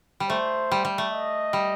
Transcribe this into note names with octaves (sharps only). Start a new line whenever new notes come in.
G3
A3 C5
G3
G3
A3
D#5
G3